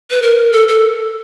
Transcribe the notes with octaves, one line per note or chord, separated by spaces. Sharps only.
B4
A#4
A4
A4